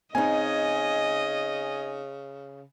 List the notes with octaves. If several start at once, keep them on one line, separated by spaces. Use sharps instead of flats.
C#3 C4 D#4 D#5 G#5